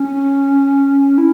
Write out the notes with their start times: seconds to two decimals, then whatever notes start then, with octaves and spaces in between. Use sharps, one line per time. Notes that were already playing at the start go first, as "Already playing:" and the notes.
Already playing: C#4
1.18 E4